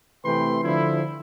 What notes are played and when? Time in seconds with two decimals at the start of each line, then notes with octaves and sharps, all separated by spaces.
0.24 C3 E3 A3 B4 G5 C6
0.64 D3 F3 E4